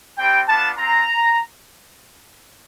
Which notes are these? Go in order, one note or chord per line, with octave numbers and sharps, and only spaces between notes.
G3 C4 E4 G4 G5
B3 D4 F4 A5
C4 F4 A#5